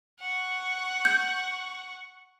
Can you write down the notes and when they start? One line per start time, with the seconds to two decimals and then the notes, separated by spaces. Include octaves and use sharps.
0.20 F#5 C#6
1.05 G6 C#7